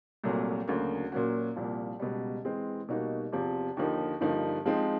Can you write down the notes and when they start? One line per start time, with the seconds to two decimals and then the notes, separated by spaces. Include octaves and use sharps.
0.24 C2 A#2 F#3 A3
0.68 D2 C#3 F#3 A#3
1.12 A#2 F#3 A#3 C#4 F#4
1.56 C2 A#2 F3
2.00 C#2 B2 G3
2.44 E3 G#3 C4
2.88 B2 G3 A#3 D#4 F#4
3.32 E2 C3 F3
3.77 D#2 D3 F3 A#3 D#4
4.21 G2 D3 F3 A#3 D#4
4.66 F3 G#3 C4 D#4